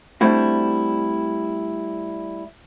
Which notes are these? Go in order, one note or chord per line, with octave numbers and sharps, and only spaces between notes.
G3 A3 C4 D4 E4 F#4